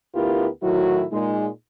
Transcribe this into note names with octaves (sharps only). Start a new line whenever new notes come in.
D2 B3 E4 F4 G4 A#4
A2 D#3 F#3 E4 F#4
A#2 G#3 D#4